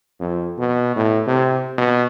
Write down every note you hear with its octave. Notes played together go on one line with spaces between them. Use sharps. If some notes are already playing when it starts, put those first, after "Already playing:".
F2
B2
A2
C3
B2